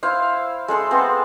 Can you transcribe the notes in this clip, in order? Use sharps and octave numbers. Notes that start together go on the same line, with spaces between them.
E4 C5 F5
G#3 A4 C6
B3 C4